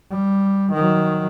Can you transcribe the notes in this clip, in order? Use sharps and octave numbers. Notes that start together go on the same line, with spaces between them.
G3
D#3 F#3